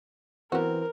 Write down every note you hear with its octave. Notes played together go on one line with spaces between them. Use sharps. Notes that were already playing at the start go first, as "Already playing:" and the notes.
E3 B3 C4 F#4 A#4